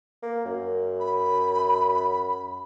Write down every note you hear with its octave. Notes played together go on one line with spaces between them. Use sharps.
A#3
F#2
B5